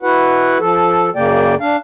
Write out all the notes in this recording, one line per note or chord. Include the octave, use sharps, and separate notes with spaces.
E4 F#4 B4 F#5
F3 A4
F#2 C#3 A#3 D5 G5
D4 F5